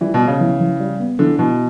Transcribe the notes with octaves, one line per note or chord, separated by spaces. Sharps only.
E3 G3
B2
B3
C#3
E3
E3
G3
B3
D3 E3
B2 E3